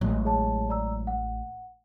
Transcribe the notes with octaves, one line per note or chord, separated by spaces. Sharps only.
A1 F#3 G#3
G#4 C#5 A5
D5 A#5 E6
F#5